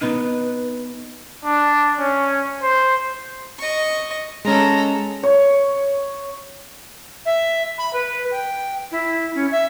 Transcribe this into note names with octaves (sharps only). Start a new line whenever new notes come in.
B3 D#4 B4
D4
C#4
C5
D#5 C#6
G#3 C#4 A4 A#5
C#5
E5
B5
B4
G5
E4
C#4
E5